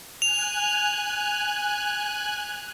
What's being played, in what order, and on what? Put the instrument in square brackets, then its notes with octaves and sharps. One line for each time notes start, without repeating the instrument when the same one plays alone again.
[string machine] G#5 F#6 [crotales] F7